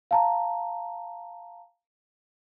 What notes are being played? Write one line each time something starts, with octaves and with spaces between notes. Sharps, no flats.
F5 A5 A#5